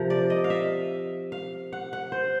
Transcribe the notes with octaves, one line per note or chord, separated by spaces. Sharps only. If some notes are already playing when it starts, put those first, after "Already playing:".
Already playing: C3 F3 A#4
D5
D#5
F5
E5
F5
F#5
F#5
C5